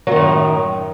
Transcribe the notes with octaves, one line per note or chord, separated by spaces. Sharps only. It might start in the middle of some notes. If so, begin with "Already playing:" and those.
F#2 A2 D#3 F#3